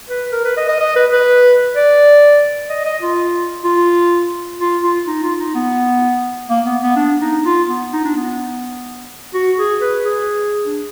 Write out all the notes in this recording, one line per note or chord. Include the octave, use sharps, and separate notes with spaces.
B4
A#4
B4
D#5
D#5
D#5
B4
B4
D5
D#5
D#5
F4
F4
F4
F4
D#4
F4
D#4
B3
A#3
B3
B3
D4
D#4
F4
B3
D#4
D4
B3
F#4
G#4
B4
G#4
D4